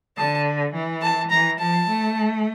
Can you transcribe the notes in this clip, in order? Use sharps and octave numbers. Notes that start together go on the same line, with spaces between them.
D3 A5
E3
A5
E3 A#5
F3 A5
A3